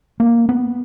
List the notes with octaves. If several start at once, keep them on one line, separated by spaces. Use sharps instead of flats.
A#3
B3